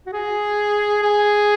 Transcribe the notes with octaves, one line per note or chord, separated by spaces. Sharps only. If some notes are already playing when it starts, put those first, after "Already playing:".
F#4
G#4
G#4